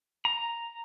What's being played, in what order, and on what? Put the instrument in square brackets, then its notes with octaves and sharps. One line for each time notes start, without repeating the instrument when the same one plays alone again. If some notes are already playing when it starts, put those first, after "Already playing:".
[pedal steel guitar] A#5